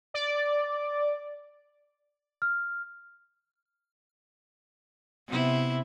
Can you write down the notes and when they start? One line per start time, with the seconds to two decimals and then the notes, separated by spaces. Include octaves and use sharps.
0.14 D5
2.42 F6
5.28 C3 B3 E4